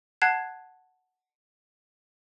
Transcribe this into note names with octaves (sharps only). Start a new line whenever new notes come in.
F#5 A5 F#6 G#6 C7